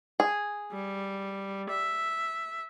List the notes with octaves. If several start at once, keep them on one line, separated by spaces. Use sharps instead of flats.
G#4
G3
E5